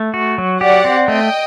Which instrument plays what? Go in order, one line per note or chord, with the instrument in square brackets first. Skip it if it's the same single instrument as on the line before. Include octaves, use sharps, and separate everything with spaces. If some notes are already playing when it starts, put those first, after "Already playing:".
Already playing: [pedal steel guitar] A3
F#4
F#3
[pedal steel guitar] G4 [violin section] D5 F#5
[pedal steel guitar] C4
[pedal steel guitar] A3 [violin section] D#5 G5